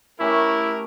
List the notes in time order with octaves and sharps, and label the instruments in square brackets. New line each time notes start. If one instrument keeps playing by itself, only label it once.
[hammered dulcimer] A3 C#4 G4 [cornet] E4 [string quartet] A#4